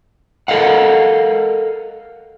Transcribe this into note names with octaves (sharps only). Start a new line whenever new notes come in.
A4 A#4 D#5 F5 F#5